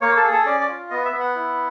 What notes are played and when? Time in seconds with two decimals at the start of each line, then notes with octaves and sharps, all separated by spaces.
0.01 A#3 C#5
0.17 A4
0.23 G#4
0.31 A4
0.45 C#4 D5
0.60 D5
0.68 F4
0.90 B3 D#5
1.05 E5
1.12 B3
1.20 F#5
1.36 E4